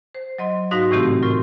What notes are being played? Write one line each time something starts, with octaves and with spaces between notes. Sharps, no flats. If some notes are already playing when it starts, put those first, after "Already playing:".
C5
F#3 D#5 C6
G#2 D#4 F#4 F5 A#6
A2 C3 E3 A3 C4 G4
A2 F4 A#4 C6